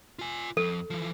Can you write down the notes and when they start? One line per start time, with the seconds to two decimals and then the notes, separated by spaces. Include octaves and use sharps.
0.19 F4 G#5
0.57 F2 A4
0.90 E3 F3